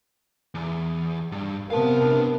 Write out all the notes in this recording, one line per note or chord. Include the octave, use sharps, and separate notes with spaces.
E2
G2
C3 B3 A#4 F5 A5
B1 D4